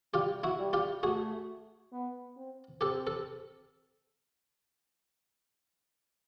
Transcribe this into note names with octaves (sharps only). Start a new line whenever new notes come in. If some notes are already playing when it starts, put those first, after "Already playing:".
G3 F4 G4
E4 F#4
G3
F4 G4
A3 F#4 G#4
B3
C4
C4 G4 A4
A4